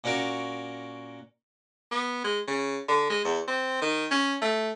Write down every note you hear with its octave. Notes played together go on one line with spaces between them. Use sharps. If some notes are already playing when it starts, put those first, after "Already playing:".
A#2 C#4 F#4 A#4 C#6 D6
B3
G#3
C#3
D3
G#3
E2
C4
D#3
C#4
A3